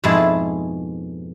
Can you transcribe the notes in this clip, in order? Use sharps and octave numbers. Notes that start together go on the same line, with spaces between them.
F2 G#2 B2 E4 G#4 A5